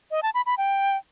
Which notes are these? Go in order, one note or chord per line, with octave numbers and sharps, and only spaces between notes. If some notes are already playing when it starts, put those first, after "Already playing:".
D#5
A5
B5
B5
G5